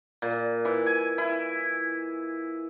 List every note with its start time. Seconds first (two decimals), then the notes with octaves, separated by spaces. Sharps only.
0.22 A#2
0.65 E3
0.86 G#5
1.18 E4